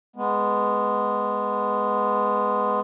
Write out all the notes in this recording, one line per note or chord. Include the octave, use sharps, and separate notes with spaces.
G#3 B3